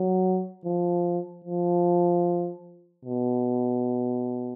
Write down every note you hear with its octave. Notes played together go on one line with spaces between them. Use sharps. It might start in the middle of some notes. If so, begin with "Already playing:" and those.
Already playing: F#3
F3
F3
B2